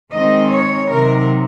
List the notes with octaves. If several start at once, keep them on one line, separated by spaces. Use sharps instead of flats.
D#3 G#3 C4 D#4 D#5
C#5
C3 D#3 F#3 A#4